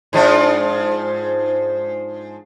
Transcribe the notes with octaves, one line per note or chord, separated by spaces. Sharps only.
G#2 F3 D4